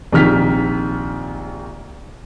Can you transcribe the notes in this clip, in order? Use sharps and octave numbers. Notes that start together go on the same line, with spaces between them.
A#1 C3 D#3 F6 B6